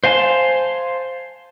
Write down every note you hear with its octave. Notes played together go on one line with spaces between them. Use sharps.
C5 F5 G#5 A5 C6